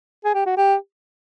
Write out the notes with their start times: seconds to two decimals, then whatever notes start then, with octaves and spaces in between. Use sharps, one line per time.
0.24 G#4
0.35 G4
0.46 F#4
0.57 G4